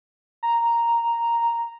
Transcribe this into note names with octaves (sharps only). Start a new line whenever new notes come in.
A#5